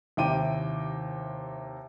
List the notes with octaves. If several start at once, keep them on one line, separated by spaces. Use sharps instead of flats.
D#2 C3 E4 G5 D6 D#7